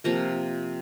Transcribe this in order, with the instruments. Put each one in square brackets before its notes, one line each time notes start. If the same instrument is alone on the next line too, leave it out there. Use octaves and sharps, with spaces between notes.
[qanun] C3 F3 A#3 A#5